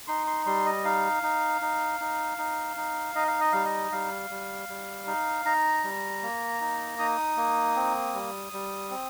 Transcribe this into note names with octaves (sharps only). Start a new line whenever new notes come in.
D#4 C6
C6
G3 C6
D#5
D#4 F5
D#4
D#4
D#4
D#4
D#4
D#4 D#5
F5
D#5
G3 F5
D#5
G3 F5
G3
G3
D#4
D#4 A#5
G3
A#3
D#4
D#4 D#6
A#3
C4
G3
G3
C4